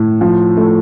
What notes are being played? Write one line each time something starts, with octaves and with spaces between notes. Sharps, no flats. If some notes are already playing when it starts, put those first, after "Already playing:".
Already playing: A2
F3
A3